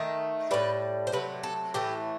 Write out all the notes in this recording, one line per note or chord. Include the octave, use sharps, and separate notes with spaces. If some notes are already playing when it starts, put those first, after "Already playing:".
Already playing: D#3 A3
A2 G3 B4
C5
C3 F#3 A3 B4
A4
A2 E3 A3 G4